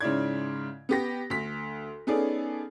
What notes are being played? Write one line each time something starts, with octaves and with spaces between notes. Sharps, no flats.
G#2 C#3 C#4 E4 D5 G#6
B3 G4 A#6
D2 B6
B3 C#4 D#4 G#4 A4 D5